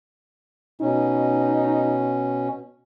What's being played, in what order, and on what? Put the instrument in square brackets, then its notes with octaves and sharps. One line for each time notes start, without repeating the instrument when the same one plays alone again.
[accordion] B2 C#4 [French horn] D#4